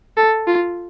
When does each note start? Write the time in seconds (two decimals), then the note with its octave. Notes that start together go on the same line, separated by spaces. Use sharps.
0.17 A4
0.47 F4